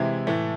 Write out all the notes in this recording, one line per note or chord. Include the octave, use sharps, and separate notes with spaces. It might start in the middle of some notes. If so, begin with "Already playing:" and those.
Already playing: C3 E3 G#3 E4
A2 E3 A3